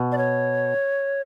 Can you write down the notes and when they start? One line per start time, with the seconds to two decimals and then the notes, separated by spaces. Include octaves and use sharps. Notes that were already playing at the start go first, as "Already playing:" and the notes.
Already playing: B2
0.12 D5
0.18 C#5